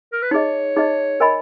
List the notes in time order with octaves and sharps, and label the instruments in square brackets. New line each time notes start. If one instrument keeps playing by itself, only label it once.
[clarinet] A#4
B4
[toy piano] D#4 G#4 D#5 [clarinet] C#5
[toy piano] D#4 G#4 D#5
A#4 D#5 G#5 B5